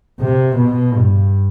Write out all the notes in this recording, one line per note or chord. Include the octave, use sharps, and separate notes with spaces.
C3
B2
G2